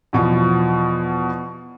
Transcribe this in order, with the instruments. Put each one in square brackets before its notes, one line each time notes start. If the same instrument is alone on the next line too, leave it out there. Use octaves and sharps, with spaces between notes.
[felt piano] E2 B2 F3